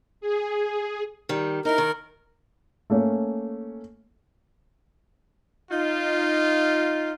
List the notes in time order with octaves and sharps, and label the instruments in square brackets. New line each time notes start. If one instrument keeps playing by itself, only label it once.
[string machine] G#4
[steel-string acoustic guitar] D#3 G3
[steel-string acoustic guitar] D#4 E4 [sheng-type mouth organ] A#4
[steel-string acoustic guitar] D#3
[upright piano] A3 A#3 C#4
[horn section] D#4 F4